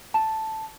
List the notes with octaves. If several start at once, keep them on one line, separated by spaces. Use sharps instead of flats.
A5